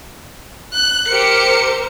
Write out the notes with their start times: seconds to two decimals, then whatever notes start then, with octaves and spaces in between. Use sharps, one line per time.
0.76 F#6
1.08 G4 A#4 C5 C#7